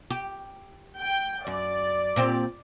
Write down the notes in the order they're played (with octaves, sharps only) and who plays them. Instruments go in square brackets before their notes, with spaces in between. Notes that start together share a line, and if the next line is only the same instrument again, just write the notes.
[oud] G4
[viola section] G5
[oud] F#2 [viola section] D5
[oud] A#2 C4 G4